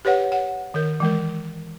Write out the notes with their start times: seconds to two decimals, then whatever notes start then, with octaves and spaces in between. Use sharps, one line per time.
0.05 G4 B4 C#5 F#5
0.32 F#5
0.74 D#3 A#4
1.00 E3 G#3 A#4